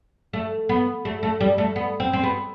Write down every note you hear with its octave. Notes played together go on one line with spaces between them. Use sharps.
A3
B3
A3
A3
G3
A3
B3
C4
C4
B3